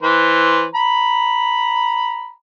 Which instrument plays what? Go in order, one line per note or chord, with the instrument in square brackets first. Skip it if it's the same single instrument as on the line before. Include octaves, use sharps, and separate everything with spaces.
[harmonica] E3 B4 C5
A#5 B5